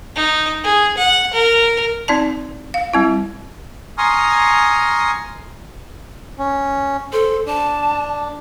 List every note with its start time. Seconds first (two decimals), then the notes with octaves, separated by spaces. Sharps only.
0.16 D#4
0.64 G#4
0.97 F#5
1.33 A#4
2.08 C4 D#4 D5 A5
2.74 F5
2.93 G3 C4 E4
3.98 G#5 A#5 C6 C#6 D#6 F6
6.39 C#4
7.13 A4 C5
7.47 D4 A5